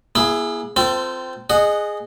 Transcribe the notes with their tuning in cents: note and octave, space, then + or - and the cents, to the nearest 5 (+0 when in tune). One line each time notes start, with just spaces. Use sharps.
B3 -45 E4 +15 G#4 +0
C4 -20 F4 +0 A4 +25
G#4 +0 D#5 -20 F#5 +0